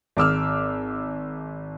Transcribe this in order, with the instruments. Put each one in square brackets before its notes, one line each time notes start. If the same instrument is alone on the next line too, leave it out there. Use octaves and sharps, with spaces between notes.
[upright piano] G#1 D6 E6 F6